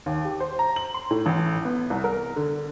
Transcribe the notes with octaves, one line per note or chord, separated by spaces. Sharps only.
D#2
G4
C5
A#5
F#7
C6
A2
A1
B3
C2
A#4
D3